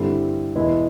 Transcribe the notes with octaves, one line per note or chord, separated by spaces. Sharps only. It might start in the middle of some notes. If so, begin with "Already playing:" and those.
Already playing: G2 D3 G3 C4 E4
E2 B2 G#3 B3 E4